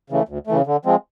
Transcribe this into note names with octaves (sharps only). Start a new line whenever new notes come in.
C#3 E3 A3
D2
C#3 E3 A3
D3
F3 G#3 C4